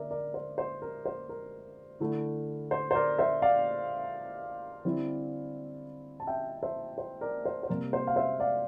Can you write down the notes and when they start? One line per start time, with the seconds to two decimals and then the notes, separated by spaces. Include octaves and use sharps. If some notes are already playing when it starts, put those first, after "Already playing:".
Already playing: D3 A#4 D5 E5
0.11 A#4 D5
0.34 C5
0.58 C5
0.82 A#4
1.06 C5
1.29 A#4
2.00 D3 A3 E4
2.71 C5
2.91 C5
2.95 A#4 D5
3.18 C5 E5
3.42 D5 F5
4.85 D3 G3 C4 E4
6.20 A5
6.27 E5 G5
6.63 C5 E5
6.98 C5
7.21 A#4 D5
7.45 C5
7.63 C5
7.69 C3 G3 A#3 A#4
7.93 C5
8.07 F5
8.16 C5 E5
8.40 D5 F5